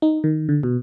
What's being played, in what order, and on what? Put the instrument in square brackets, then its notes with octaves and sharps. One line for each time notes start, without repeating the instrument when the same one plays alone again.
[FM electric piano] D#4
D#3
D3
B2